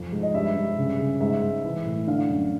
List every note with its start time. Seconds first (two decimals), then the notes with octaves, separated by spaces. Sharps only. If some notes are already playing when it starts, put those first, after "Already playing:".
Already playing: F2 F3
0.12 G#2
0.23 D#5
0.34 G2 E5
0.56 G2
0.77 C#3
0.99 C#3
1.20 G#2 E5
1.43 G#2
1.64 E3
1.86 A2
2.07 D3 F5
2.29 F#2